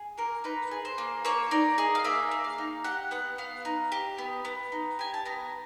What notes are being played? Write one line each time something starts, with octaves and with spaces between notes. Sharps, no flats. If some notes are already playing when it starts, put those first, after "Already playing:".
Already playing: G#4
A#3 A#4
D#4 B4
G#4
C5
A#3
A#3 C#5
D#4 D5
G#4 D#5
F5
A#3 E5
A#3
F5
D#4
G4 F#5
B3 F#5
B3 F5
D#4
G4
B3
B3
D#4
G4 G#5
A5
B3 A#5